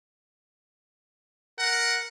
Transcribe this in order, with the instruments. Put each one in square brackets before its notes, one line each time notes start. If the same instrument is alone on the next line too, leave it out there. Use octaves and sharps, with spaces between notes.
[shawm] A#4 [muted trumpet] F#5